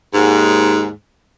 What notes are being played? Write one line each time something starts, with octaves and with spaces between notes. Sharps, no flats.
D#2 G#2